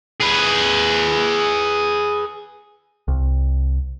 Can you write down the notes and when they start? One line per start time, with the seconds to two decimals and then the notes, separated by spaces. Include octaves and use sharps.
0.20 G#4 B4
3.08 C2